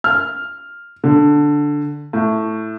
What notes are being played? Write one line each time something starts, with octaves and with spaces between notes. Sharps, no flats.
F6
D3
A2